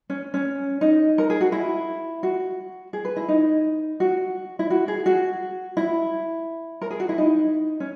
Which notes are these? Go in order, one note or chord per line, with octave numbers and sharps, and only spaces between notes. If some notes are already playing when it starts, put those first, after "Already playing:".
C#4
C#4
D#4
A#4
G#4
F#4
E4
F#4
G#4
B4
E4
D#4
F#4
E4
F#4
G#4
F#4
E4
A#4
G#4
F#4
E4
D#4
C#4